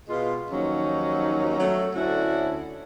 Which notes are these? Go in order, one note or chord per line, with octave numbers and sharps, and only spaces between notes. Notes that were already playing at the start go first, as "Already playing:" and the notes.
B2 G#3 F4
D#2 F3 F#3 C#4 D#4
F#3 A3
D2 C#4 D4 E4 F#4